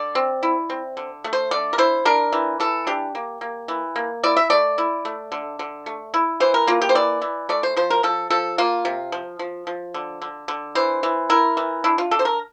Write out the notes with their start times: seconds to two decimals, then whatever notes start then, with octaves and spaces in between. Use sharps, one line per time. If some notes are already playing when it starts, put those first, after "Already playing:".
Already playing: D3 D5
0.15 C4
0.43 E4
0.70 C4
0.97 D3
1.24 A3
1.33 C5
1.51 D3 D5
1.73 A#4
1.78 E4 C5
2.05 D4 A#4
2.33 E3
2.60 E3 A4
2.87 D4 G4
3.15 A#3
3.41 A#3
3.68 E3
3.96 A#3
4.23 E4 D5
4.37 E5
4.50 A3 D5
4.78 E4
5.05 A3
5.32 D3
5.59 D3
5.86 A3
6.14 E4
6.40 E3 C5
6.54 A#4
6.67 A#3 F4
6.82 G4
6.89 C5
6.95 E3 D5
7.22 E3
7.49 A3 D5
7.63 C5
7.77 F3 C5
7.90 A#4
8.03 F3 A4
8.30 F3 A4
8.58 A#3 F4
8.85 C3
9.12 F3
9.39 F3
9.67 F3
9.94 D3
10.22 D3
10.48 D3
10.75 E3 C5
11.03 E3
11.30 E4 A#4
11.57 E3
11.84 D4 E4
11.98 F4
12.11 D4 A4
12.19 C5
12.25 A#4